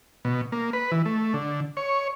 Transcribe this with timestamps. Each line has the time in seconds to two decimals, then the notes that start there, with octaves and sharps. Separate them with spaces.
0.25 B2
0.52 A#3
0.73 B4
0.92 E3
1.05 A3
1.34 D3
1.77 C#5